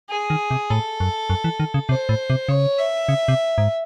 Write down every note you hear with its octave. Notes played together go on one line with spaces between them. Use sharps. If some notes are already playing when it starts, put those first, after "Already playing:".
G#4
D#3
C3
A2 A4
F#2
F#2
E3
D#3
C#3
C3 C5
A2
C3
C#3 C#5
E5
C#3
C3
G#2